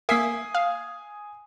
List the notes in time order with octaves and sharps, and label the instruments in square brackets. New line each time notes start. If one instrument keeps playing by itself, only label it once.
[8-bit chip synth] A#3 A#4 [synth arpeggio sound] E5 B6 [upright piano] G#5 D#6 C7
[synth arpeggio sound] F5